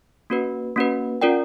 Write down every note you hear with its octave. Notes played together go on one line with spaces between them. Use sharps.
A#3 C#4 F#4 B4
A#3 C#4 F#4 B4
C#4 F4 A#4 D5 G5